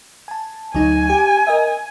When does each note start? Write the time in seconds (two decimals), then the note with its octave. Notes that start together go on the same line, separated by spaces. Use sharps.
0.28 G#5 A5
0.75 D2 F#3 D#4 G#5
1.10 G4
1.47 A#4 D#5 E5